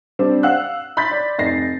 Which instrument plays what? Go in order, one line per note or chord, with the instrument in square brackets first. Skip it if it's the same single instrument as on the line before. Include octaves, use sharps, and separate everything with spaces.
[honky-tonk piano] G3 C4 D4
F5 F#5 E6 F#6
B5 C6 G6 A6 B6
D5
F1 D#4 A6 A#6 C7